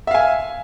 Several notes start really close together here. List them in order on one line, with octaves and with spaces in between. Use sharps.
E5 F5 G#5